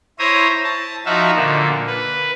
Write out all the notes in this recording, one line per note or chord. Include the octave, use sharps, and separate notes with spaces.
E4 C5 C#5 E5 A#5 D#6
A5
F3 D#4 F#4 E5 F5
A#2 D3
B4